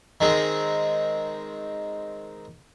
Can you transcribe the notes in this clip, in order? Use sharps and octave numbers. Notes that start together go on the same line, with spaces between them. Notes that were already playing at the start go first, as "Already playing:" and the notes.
D#3 G#3 C4